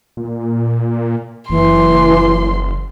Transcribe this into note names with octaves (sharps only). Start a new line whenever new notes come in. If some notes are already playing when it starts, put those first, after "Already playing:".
A#2
F#1 E3 C6